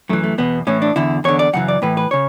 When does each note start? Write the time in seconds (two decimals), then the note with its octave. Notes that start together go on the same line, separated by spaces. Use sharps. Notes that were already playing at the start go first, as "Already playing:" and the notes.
0.09 F#2 E3 A3
0.24 A3
0.38 E2 B2 B3
0.67 A2 E3 C#4
0.82 D4
0.96 E2 D3 E4
1.24 E2 D3 C#5
1.39 D5
1.53 F#2 C#3 E3 F#5
1.68 D5
1.82 A2 E3 B4
1.97 B4
2.11 C#3 C#5